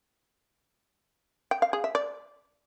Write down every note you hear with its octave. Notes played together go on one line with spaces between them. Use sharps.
G5
F5
G#4
E5
D5